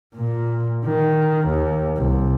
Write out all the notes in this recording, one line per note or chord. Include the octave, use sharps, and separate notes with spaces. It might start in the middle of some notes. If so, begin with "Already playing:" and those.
A#2
D#3
D#2
C2